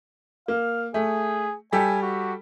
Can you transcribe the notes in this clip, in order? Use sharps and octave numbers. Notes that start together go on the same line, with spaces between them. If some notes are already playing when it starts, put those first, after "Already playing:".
A#3 F5
A3 G#4
G3 G4 A4 G#5
F#4